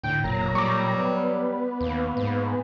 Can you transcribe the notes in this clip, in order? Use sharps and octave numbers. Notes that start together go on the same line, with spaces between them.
D2 A2 G5
F1 A#2 F#3 A#5
G3 C#6 D6
B3
D#2 A#3
G#2